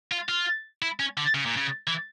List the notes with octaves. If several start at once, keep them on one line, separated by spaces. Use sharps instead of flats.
F4
F4
E4
C#4
D3
C#3
A#2
C#3
E3